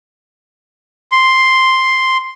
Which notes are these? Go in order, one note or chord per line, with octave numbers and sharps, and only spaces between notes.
C6